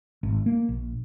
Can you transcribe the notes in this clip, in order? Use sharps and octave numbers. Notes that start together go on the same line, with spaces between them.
G#1
A#3
A#1